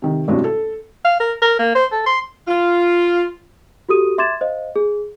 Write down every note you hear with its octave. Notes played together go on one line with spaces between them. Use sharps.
C3 D#3
A1 G2 C3 F#4
A4
F5
A#4
A#4
A#3
C5
A4
C6
F4
F#4 G4 A4 D#6 D#7
E5 C6 D6 G#6 A6 E7
C5 D#5 F5
G#4